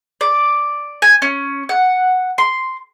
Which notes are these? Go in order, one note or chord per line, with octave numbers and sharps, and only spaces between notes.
D5
G#5
C#4
F#5
C6